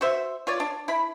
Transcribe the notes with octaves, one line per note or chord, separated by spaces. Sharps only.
F#4 C5 E5
F4 C#5 D5
D4
E4 B5